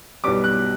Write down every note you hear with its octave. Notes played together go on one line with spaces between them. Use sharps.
B1 B2 G3 B3 D6
F#6